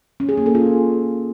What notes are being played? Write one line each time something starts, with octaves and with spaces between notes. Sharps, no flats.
C#4
G#4
A#3
A4
F4